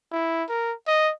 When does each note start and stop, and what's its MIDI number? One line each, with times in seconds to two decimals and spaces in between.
0.12 0.44 64
0.49 0.73 70
0.87 1.12 75